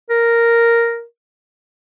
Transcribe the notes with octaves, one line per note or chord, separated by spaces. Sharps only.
A#4